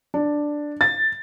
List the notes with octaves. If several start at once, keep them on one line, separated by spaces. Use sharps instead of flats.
D4
A6